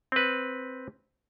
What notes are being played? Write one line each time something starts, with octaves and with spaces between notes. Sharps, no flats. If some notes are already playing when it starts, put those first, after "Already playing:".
C4 B4